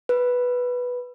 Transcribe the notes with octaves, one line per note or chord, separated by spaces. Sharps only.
B4